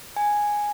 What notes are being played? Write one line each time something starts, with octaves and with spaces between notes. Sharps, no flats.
G#5